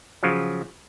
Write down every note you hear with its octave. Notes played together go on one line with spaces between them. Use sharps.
C#3 F3 F#3